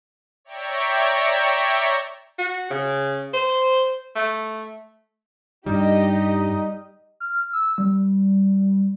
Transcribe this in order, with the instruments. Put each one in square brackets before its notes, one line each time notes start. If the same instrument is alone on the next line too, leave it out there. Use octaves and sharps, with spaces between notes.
[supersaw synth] C#5 D5 E5 G5 A#5 C#6
[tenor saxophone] F#4
C#3
C5
A3
[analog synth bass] G2 [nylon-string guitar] G3 [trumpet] D#4 [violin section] G4 D#5
[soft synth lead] F6
E6
G3